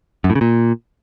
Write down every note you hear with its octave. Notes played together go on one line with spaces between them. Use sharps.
F#2
A2
C#3
A#2